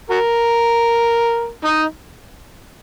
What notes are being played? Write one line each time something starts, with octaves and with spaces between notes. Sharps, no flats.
F#4 A#4
D#4